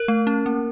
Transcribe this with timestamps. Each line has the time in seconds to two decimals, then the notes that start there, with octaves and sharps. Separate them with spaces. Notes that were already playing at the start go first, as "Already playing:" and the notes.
Already playing: A#4
0.08 A3
0.27 C#4
0.46 A#3